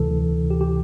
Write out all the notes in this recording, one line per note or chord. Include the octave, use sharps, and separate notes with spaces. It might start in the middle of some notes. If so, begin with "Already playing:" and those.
Already playing: D2 C3 E3 A4
G4
G4